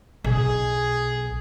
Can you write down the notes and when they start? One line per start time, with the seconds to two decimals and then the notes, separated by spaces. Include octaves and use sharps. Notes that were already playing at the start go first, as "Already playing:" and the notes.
0.24 B1 G#4